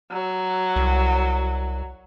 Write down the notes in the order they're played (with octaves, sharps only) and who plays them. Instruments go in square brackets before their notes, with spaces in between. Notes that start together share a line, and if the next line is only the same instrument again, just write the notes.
[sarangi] F#3
[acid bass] C2